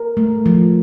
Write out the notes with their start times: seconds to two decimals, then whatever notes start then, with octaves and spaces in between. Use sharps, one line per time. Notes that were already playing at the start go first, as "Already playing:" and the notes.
Already playing: A#4
0.17 A3
0.46 F3